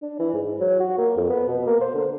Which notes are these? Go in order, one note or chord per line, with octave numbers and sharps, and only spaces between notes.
D4
E3
G#2
F#3
F#4
A#3
F2
B3
B2
A#3
C5
D3